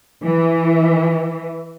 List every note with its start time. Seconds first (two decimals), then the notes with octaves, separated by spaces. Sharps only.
0.24 E3